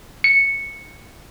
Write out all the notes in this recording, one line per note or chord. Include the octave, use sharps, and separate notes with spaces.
C#7